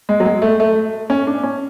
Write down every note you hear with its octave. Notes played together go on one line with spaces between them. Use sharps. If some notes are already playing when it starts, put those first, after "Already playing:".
G#3
F#3
G#3
A3
A3
C#4
D4
C#4